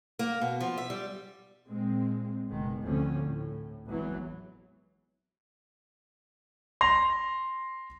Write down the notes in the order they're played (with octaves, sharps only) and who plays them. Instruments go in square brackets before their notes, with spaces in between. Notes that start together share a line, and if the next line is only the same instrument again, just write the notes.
[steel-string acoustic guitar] A#3
B2
F3
E5
G3
[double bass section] A#2 G#3 C4
F#1 B2 D#3 G#3
D2 A2 D3 F3 C4 C#4
A2
G#1 E2 E3 F#3
[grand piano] C6 A#6 F7